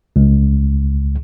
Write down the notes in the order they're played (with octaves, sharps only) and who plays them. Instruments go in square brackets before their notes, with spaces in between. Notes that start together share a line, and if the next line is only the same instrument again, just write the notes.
[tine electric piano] C#2